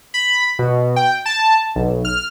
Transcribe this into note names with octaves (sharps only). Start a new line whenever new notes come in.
B5
B2
G5
A5
B1
F6